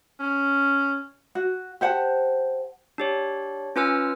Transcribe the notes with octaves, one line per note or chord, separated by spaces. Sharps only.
C#4
F#4
G4 C5 F#5 A5
D4 G4 C#5
C#4 F4 B4 G#5 E6 F6